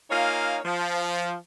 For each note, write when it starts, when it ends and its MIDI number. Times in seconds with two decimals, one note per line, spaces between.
0.11 0.60 58
0.11 0.60 63
0.11 0.60 65
0.11 0.60 73
0.11 0.60 77
0.11 0.60 80
0.65 1.35 53